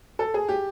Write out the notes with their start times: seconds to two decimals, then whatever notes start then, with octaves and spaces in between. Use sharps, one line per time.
0.19 A4
0.34 G#4
0.48 G4